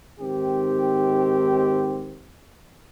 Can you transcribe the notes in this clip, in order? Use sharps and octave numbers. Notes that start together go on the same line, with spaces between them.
G#2 D#3 C4 G4